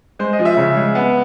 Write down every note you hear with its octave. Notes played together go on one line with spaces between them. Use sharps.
G#3 C5
D#5
F3
E5
C#3
G#3
B3